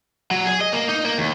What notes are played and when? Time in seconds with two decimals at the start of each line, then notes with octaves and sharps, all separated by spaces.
0.31 F#3
0.45 G#4
0.61 D#5
0.73 A#3
0.89 D#4
1.05 A#3
1.18 D#2